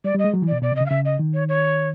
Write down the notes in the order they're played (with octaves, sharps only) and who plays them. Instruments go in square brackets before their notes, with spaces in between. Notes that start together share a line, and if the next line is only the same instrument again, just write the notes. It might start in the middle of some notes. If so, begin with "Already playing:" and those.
[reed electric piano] G3 [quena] D5
[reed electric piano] G3
[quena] D#5
[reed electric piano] G#3
F#3
E3
[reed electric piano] B2 [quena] D5
[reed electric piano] B2 [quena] D5
[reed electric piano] C3
[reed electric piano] C#3 [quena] D#5
[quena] F5
[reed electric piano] C#3 [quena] E5
[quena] D#5
[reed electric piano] D#3
[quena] C#5
C#5